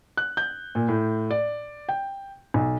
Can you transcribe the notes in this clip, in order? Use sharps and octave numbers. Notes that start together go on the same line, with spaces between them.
F#6
G6
A#2
A2
D5
G5
B1